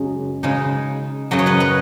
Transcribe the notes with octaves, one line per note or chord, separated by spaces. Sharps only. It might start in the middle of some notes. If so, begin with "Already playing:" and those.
Already playing: F#2 C#3 G#3 D#5
C#3 G#3 D#4
F#2 C#3 F#3 D#5
C#5
B4 D#5
B4 D#5